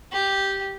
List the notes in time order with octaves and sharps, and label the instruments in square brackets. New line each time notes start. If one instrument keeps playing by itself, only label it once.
[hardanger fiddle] G4